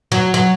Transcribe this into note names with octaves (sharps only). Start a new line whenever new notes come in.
F#3
F#3